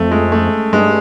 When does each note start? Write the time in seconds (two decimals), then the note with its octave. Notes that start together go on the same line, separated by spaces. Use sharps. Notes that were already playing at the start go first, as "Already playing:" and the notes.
Already playing: F2 A3
0.11 G#3
0.32 A3
0.73 G2 G#3